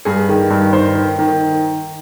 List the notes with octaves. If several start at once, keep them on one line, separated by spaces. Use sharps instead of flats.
G2 G#4
D#3
G2
D#3 C5
D#3
D#3